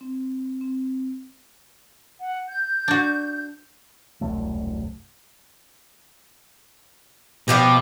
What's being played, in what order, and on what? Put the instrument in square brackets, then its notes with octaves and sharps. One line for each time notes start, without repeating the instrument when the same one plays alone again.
[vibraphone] C4
C4
[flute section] F#5
G6
[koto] D4 F#4
[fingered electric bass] E1 C2 F#2 A3
[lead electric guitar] B2 [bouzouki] F3 G4 D#5